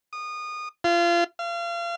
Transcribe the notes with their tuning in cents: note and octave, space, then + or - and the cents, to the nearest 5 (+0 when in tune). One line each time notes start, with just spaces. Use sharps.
D#6 -25
F4 -30
F5 -35